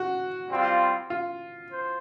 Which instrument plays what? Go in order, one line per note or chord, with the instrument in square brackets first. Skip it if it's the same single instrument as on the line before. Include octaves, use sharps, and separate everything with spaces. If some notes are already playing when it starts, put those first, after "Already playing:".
Already playing: [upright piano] F#4
[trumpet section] G3 C4 F4
[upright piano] F4
[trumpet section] C5